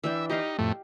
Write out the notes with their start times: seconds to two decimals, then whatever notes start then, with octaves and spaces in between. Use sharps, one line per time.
0.04 E3 D4 E5 G5
0.30 D#4 G4 D#5 F5
0.59 F2 A2 A3